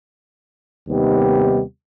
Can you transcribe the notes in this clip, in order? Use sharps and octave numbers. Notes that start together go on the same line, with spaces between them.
D#2 C3 G3 B3 D#4 G4